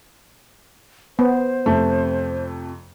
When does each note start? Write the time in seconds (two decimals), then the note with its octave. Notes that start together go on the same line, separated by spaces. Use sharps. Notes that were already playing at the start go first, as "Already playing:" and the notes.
1.19 B3 C5
1.66 F2 C3 A3